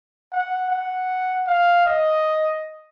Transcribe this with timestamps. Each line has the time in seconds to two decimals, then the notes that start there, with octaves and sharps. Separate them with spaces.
0.32 F#5
0.70 F#5
1.47 F5
1.86 D#5